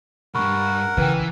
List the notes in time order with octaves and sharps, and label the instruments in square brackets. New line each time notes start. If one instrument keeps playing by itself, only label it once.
[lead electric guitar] C2 G2 [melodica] A#4 F#5 [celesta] B5 C#6
[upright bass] C#3 [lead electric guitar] E3 [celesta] B4 G5